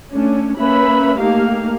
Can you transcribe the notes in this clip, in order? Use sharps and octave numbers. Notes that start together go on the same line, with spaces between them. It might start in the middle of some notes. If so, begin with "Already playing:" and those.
A3 C#4 D4
A#3 C#4 B4 E5 B5
A3 A#3 D#4 G4 F5